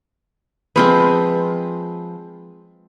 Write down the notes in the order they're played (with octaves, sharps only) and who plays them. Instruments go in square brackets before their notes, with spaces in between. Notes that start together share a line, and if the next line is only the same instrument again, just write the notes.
[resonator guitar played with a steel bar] F3 B4 [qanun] G#3 C4 G#4